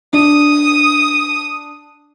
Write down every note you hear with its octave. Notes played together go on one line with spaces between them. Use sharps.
D4 D#6